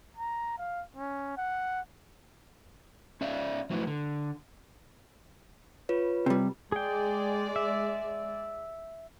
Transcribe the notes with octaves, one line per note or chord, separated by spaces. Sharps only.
A#5
F5
C#4
F#5
C#4 C#5 D5 E5
F3 F#3 A3 E4 B4
D3
F4 B4 C#5
C3 G3
G#3 G#4 D5 G5
E5